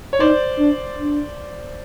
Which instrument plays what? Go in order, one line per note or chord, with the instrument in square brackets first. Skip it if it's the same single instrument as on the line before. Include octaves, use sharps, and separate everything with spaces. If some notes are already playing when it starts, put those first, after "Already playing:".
[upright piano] C#5
[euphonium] D#4 [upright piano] C5 D5
[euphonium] D4
D4